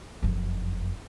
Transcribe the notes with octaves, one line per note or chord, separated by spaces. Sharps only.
F#1 F2